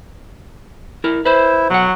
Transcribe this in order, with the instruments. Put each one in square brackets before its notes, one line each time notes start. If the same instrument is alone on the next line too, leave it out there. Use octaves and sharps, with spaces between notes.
[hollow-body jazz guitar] E4 A#4
[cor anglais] E4 [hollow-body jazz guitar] B4 C5
[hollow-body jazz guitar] B1 F#5 [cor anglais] F#3